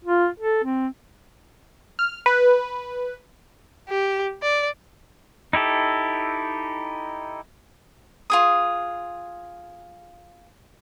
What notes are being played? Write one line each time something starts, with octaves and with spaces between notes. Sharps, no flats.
F4
A4
C4
F6
B4
G4
D5
D#4 E4 G4 A4
F4 G#4 D#6